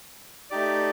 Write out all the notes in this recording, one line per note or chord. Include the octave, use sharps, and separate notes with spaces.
A3 D#4 G4 D5